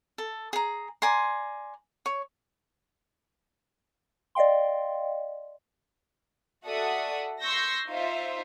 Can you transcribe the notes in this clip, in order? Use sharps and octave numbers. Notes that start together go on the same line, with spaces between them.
A4
G#4 A#5
D5 G#5 A#5 C6
C#5
D5 D#5 F5 G5 C6
F#4 A4 D5 E5 F#5 D#6
C6 C#6 E6 G6 A#6
D#4 F4 C5 E5